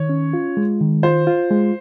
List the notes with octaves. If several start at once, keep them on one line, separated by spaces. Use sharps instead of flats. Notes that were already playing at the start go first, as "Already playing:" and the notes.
Already playing: D#3 C#5
C#4
F4
G#3
D#3
F4 C5
F4
G#3